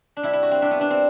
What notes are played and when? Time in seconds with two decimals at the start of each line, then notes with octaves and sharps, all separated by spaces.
0.17 D4
0.23 C3 G3 E4
0.33 E4
0.42 F#4
0.51 C4
0.61 C3 G3 D4
0.71 B3
0.81 D4
0.90 C4